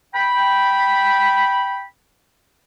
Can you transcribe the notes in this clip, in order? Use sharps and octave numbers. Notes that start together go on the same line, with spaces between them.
G5 B5